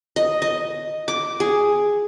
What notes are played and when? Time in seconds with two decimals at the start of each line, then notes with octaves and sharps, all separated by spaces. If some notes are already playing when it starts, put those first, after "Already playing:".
0.16 D#5
0.42 D#5
1.08 D6
1.40 G#4